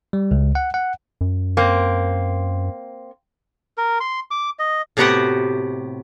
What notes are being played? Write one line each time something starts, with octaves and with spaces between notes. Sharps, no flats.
G3
C#2
F#5
F#5
F#2
A#3 C4
A#4
C6
D6
D#5
A2 C3 B3 F#4 G4 F#5